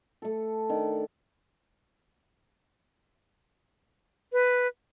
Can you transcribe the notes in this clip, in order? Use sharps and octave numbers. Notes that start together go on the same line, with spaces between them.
A3 A4
D#3 D4
B4